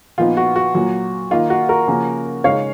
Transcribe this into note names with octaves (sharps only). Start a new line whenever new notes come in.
A#2 F3 B3 D#4 F4
F#4
F#4
A#2 F#3 A#3
D#3 A#3 D#4 F4
F#4
F#4 A#4
C#3 F3 A#3 C#4
C#3 G#3 D#4 C#5 F5